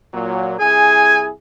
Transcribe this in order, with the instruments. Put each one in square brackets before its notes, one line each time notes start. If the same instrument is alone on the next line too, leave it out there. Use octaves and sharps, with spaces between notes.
[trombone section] A#2 F#3
[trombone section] C2 E4 G#4 [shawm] G#5